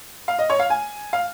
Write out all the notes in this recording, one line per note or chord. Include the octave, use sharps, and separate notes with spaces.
F5
D#5
C#5
F5
G#5
F5